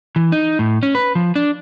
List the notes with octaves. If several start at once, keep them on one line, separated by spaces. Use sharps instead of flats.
E3
D#4
A2
C#4
B4
F3
D4